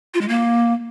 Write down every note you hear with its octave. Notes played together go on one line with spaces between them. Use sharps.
F4
G#3
A#3